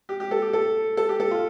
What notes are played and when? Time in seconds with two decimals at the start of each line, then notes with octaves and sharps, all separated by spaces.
0.09 G4
0.20 G4
0.31 A4
0.42 G4
0.53 A4
0.97 A4
1.09 G4
1.20 A4
1.31 F4